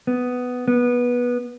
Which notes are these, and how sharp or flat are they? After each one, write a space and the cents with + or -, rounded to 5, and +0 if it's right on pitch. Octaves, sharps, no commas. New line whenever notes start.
B3 +10
B3 -15